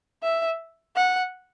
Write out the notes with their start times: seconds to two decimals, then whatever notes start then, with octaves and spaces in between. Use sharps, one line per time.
0.23 E5
0.96 F#5